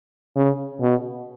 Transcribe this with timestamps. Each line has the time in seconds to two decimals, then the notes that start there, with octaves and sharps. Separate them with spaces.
0.36 C#3
0.81 B2